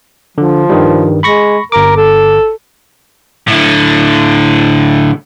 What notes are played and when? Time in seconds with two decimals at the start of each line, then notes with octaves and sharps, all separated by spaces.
0.38 D3 F3
0.70 G2 D#3 G3
1.23 G#3 B5 C#6 A#6
1.72 G1 A#4 D6
1.97 A4
3.48 A2 D3